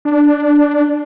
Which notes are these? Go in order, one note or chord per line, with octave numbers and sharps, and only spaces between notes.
D4